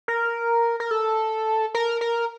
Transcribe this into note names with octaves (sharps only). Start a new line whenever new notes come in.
A#4
A#4
A4
A#4
A#4